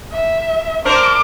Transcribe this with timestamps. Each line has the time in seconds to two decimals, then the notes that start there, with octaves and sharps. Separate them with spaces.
0.12 E5
0.85 D4 A#4 C5 D6